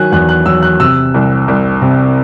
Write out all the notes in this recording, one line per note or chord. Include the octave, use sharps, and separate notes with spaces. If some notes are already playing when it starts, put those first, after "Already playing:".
Already playing: D#3 F#3 G#5 F#6
E2 F#6
F#6
F#3 E6
F#6
C3 E6
C2
C2
C3